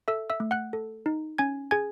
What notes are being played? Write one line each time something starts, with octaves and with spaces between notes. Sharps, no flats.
A4 E5 E6
E5 E6
A3
F#5 F#6
A4
D#4
C#4 G#5 G#6
G#4 G#5 G#6